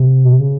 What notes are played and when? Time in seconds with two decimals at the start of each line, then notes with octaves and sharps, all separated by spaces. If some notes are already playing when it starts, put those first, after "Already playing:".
Already playing: C3
0.25 B2
0.33 C3
0.40 C#3